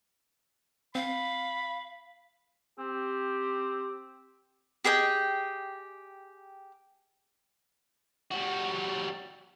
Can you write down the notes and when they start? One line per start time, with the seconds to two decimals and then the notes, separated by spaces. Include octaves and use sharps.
0.95 C4 F5 B5
2.79 C4 G4
4.84 G4 G#4 D#5 G5
8.31 G3 F#4